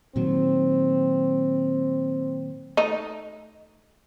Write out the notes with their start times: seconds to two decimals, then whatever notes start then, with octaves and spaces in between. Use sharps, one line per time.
0.16 A#2 D#3 F#3 C4
2.77 A3 D#4